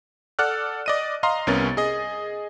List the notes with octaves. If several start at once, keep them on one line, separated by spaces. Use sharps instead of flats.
A4 D5 F#5 F6 F#6
D5 D#5 D#7
D#5 F5 A#5 C6
C2 B3 C#4 A#4 A6
G#4 D#5